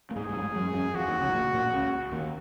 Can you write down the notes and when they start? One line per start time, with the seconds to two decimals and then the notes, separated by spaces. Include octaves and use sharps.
0.11 A#3
0.16 G#2 G#3 G#4
0.29 G#2 G#3
0.36 F#3
0.42 G#2 G#3
0.55 F#2 F#3
0.74 F#2 F#3
0.94 F2 F3 F#4
1.08 D#2 D#3
1.21 C#2 C#3
1.29 G#2
1.34 A#1 A#2
1.53 A#1 A#2
1.73 C#2 C#3
2.12 D#2 D#3